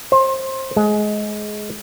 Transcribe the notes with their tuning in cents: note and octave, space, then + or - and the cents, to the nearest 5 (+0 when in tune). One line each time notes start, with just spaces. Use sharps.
C5 +25
G#3 +20